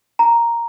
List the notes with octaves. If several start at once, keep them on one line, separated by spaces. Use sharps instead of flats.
A#5